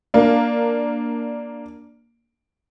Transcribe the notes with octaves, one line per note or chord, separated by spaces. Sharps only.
A#3 D4